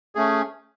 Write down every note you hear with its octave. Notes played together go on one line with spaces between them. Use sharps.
A3 C#4 G#4